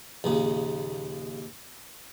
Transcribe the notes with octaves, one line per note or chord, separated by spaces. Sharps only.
A#1 D#2 C#3